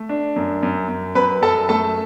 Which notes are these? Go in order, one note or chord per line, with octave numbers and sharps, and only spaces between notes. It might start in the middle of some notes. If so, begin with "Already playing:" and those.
Already playing: A3
D4
F#2
F#2
F#2
F#2 B4 B5
F#2 A4 A5
A3 A4 A5